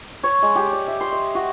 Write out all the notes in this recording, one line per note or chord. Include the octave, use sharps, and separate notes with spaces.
C#5
G#3
G4
D5
E5
C6
D#5
F#4